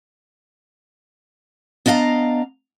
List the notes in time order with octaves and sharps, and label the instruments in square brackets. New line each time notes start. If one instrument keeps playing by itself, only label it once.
[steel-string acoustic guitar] B3 D4 D#5 F5 A#5